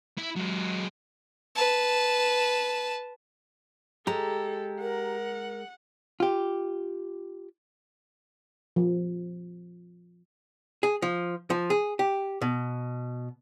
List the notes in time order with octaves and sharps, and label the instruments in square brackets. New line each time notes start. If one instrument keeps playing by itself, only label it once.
[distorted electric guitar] E4
F#3 G#3
[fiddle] B4 A5
[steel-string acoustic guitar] G#3 [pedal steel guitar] G4 A#5 [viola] A4
[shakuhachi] A#4 [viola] F#5
[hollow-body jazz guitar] F4 G4
[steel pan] F3
[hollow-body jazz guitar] G#4
F3
F3
G#4
G4
B2